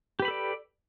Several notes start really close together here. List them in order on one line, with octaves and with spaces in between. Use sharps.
G4 B4 B5 A4 D5